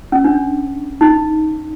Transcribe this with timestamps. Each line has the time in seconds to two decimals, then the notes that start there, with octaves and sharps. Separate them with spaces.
0.12 C#4
0.24 D4
1.01 D#4